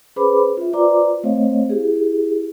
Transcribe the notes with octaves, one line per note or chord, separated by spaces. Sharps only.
C#4 G#4 B4 C5 B5 D6
F4 E5
F4 B4 C5 D5 A#5 D6
A3 C4 C5 C#5 D#5 F5
E4 G4 G#4